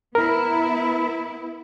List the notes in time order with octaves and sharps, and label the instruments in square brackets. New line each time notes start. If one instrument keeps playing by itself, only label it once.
[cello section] B3 E4 [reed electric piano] A#4